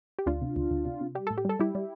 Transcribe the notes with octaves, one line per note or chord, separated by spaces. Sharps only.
G4
D2 D4 F4
C3
D2
D2
C3
C3
G3 G4
A2 A4
G4
G3 A4
G3 E4 G4
G3